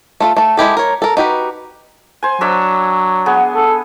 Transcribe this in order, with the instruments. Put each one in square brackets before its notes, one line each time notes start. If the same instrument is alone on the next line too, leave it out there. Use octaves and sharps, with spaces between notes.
[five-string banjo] A3 F4 A4
A3 A4
G#3 E4 G4 A4
A#4 C#5
A4 A#4
D#4 F#4 G4 B4
[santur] C5 G#5
[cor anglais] F#3 [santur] D4 C#5 E5
[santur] B3 G#4
[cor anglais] A4